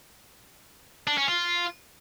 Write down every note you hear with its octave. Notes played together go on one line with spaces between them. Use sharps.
D4
C#4
F4